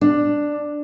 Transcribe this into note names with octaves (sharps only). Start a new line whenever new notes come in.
D4